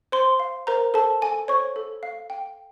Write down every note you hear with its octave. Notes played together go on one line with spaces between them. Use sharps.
C5 C6
F5
A#4 C5 A#5
A4 C5 A5
A4 G#5
C5 C#5 C#6
A4
F5
G5